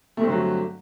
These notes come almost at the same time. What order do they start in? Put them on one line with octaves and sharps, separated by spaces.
A3 G2 C4 D3 F#3